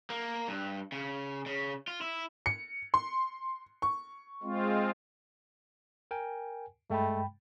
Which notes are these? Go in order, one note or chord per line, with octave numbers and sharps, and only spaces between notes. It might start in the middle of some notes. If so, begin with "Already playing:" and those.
A#3
G2
C#3
C#3
F4
E4
C#7
C6
C#6
G#3 C4 F4
A#4 G5 G#5
G2 G#3 A3 G5 B5